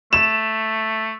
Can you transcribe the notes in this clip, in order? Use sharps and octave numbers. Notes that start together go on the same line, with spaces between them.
A3 E7